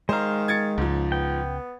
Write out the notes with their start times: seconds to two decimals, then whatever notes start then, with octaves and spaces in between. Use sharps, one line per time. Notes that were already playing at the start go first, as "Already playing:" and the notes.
0.09 D#3 G#3 C5 F5 A#5
0.48 G#6 A6 C#7
0.78 C#2 G#2 F3
1.12 B3 G5